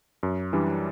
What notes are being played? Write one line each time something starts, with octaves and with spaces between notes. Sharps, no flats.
F#2
E3 G3 D4